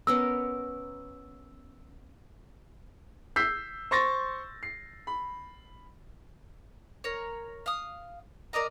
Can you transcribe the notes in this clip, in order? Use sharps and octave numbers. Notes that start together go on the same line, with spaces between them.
B3 C#4 A#4 E6
E6 G6 B6 C7
C5 C6 C#6 A6 A#6
C7
B5
A#4 C#5
F5 D#6
A#4 D5 D#5 A#5